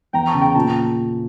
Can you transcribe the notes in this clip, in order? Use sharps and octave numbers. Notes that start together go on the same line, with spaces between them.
E2 G5 A#5
A5 C#6
C#3
G5 A#5
A#2 A5 C#6